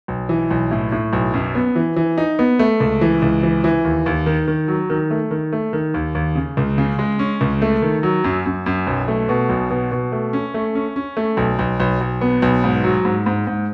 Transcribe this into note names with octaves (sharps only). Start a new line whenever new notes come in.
B1
E3
B1
A2
A2
B1
F#2
B3
E3
E3
D#4
B3
A3
C#2
E3
C#2
E3
E3
D#2
D#2
D#3
D#3
F#3
D#3
A3
D#3
A3
D#3
D#2
D#2
C#3
C#2
C#3
G#3
C#4
C#2
A3
D#3
F#3
F#2
F#2
F#2
B1
A3
B2
B1
B2
B2
A3
C#4
A3
C#4
C#4
A3
B1
B1
B1
B1
B3
B1
G#2
F#3
G#2
G#2
G#2